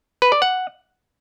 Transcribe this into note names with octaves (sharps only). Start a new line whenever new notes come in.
B4
D5
F#5